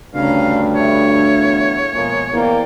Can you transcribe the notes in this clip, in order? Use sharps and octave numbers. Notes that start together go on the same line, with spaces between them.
D2 G2 C#3 C#4 F5 A#5
A4 C#5 E5 F5
E2
B2 F3 G#3 A#3
E2 A#3 C5 D5 G5